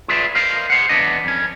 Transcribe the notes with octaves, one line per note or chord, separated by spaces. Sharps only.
F4 G#4 B4 D5 E5
A#4 C5 D#5 F5
G#4 C5 F#5
E2 B3 D4 D#5
F2 C#4